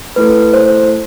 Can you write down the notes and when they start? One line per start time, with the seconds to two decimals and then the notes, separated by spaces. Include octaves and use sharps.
0.16 A3 E4 A4 B4
0.53 C5